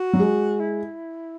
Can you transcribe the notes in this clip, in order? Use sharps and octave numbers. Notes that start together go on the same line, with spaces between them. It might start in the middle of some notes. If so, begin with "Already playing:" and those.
Already playing: F#4
F#3
G#3
E4